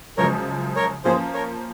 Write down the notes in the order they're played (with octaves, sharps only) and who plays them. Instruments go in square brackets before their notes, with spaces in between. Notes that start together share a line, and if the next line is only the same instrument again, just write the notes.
[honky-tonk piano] F#2 C#3 F3 G#3 [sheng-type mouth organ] A#4 C#5
[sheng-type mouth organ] A#4 C#5
[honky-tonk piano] F3 A#3 C#4 F4 [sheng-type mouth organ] G#4 C5
[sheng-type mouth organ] A#4 C#5